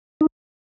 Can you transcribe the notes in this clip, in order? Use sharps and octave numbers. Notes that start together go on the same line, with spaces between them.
D#4